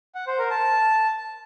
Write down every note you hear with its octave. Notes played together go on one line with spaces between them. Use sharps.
F#5
C5
A#4
A5